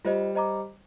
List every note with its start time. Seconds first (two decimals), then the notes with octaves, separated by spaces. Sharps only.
0.05 G3 F4 C5 D#5
0.35 C5 D#5 A#5 D6